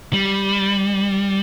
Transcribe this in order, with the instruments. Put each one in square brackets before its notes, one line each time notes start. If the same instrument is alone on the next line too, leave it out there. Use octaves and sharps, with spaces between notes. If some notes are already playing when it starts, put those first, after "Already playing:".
[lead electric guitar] G3